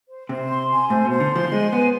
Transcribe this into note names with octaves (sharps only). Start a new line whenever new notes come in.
C5
C3 C5
C6
G#5
A2 C5
B2 C5
D3
F3 C6
G#3 G#5
B3 C5